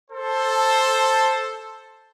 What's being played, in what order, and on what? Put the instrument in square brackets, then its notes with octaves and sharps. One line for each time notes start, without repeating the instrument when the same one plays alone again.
[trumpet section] A4 C5